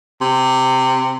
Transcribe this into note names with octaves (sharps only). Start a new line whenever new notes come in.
C3